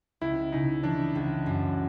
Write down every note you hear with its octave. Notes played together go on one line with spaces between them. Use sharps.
C#2 E4
C#3 D#4
E3 D4
C#2
F#2